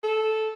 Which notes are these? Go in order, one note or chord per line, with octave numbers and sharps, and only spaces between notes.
A4